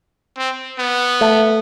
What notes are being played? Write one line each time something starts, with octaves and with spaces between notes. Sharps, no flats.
C4
B3
A3